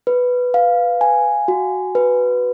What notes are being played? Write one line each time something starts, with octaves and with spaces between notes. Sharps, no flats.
B4
F5
G#5
F#4
B4